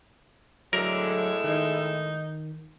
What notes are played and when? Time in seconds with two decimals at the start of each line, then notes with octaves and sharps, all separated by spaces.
0.73 A2 D3 F#3 G#3 A#4 E5
1.44 D#3 D#4